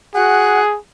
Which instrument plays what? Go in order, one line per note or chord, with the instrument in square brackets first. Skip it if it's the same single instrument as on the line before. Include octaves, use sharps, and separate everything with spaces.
[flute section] F#4 F#5 F#6 [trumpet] G#4